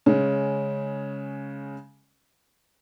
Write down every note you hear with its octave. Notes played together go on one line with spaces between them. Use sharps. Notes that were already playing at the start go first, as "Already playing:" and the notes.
C#3 G#3 C#4